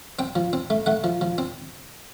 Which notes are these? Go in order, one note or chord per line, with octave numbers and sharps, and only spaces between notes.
C4 G5
F3
C4
A3
A3 F#5
F3
F3
C4